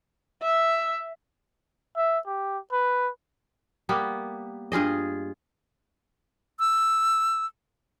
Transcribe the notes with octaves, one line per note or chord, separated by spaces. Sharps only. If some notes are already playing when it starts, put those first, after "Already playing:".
E5
E5
G4
B4
G3 A#3 B3
G2 F4 G#4 D#5
E6